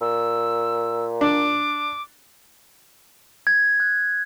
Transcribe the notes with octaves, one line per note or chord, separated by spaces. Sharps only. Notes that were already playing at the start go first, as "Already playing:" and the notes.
A#2 E6
D4 D6
G#6
F#6